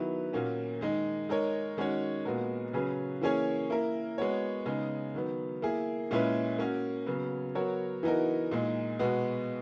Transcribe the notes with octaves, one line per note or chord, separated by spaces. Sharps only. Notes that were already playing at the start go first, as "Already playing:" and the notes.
Already playing: D#3 F#3 B3 E4 B4
A#2 A#3 C#4 F#4
D#3 G#3 D#4
G#3 D#4 A#4 C#5
D#3 G#3 C#4 F#4 C#5
A#2 G#3 B3 F#4 A#4
C#3 F#3 C#4 G#4 B4
E3 A#3 C#4 G#4 C#5
A#3 E4 A#4
G#3 B3 F#4 C#5
C#3 G#3 B3 D#4
D#3 F#3 B3
A#3 E4 G#4
A#2 G#3 C#4 E4 B4
A#3 C#4 F#4
C#3 F#3 B3
F#3 B3 F#4 A#4 C#5
E3 B3 D#4 F#4 A#4
A#2 G#3 D#4
B2 G#3 B3 F#4